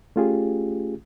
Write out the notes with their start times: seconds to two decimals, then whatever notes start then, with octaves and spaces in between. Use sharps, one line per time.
0.16 A3 C#4 F4 G4 G#4